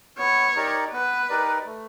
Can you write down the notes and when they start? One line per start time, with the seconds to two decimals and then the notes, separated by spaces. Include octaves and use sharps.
0.18 B3 C#5
0.56 D#4 G4 A#4 D5
0.92 B3 B4
1.29 D#4 G4 A#4 D5
1.66 A3